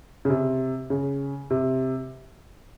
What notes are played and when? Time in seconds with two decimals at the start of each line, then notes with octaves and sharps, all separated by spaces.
0.25 C#3
0.30 C3
0.90 C#3
1.50 C3